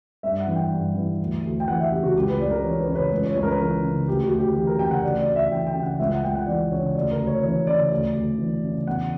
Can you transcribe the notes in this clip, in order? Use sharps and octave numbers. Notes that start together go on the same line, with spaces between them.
G2 E5
F#5
E3
G5
G2
E3
D2
D2
G5
E3 F#5
E5
C#3 G4
F#4
C#2 G4
B4
C#2 D5
A#4
E3 C#5
B4
C#3 C#5
B4
C#2 B4
C#5
C#2 C#5
A#4
B4
E3 A#4
C#3
D2 G4
F#4
D2
G4
E3 G4
A#4
C#3 G5
F#5
D2 D5
D5
D2
E5
E3 G5
G5
C#3
F#5
C#2 E5
F#5
C#2 G5
F#5
E3 D5
C#3 C#5
D2 D5
A#4
D2
C#5
E3 C#5
C#3 D5
D2
D2
E3
C#3
E2 F#5